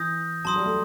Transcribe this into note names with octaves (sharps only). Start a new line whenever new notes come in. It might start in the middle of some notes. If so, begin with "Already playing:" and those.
Already playing: E3 D#6 G6 A#6
F#3 A5 C6 D#6
G3
A3